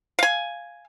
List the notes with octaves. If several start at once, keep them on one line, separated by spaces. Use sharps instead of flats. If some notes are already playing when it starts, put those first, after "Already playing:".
F5 G#5